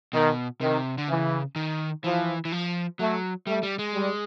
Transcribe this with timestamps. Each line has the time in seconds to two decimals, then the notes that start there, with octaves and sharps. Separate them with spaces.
0.13 B2 D#3
0.61 C3 D#3
0.98 D3
1.09 C#3 E3
1.56 D#3
2.04 E3 F3
2.45 E3
2.52 F3
2.99 F#3 A3
3.46 G3 A3
3.63 G3
3.79 G#3
3.94 G3